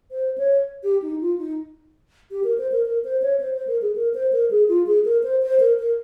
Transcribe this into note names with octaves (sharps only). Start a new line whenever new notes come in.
C5
C#5
G4
D#4
F4
D#4
G4
A#4
C5
A#4
A#4
C5
C#5
C5
C5
A#4
G#4
A#4
C5
A#4
G#4
F4
G#4
A#4
C5
C5
A#4
A#4